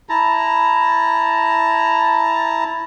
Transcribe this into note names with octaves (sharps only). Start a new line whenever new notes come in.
E4 A5 A#5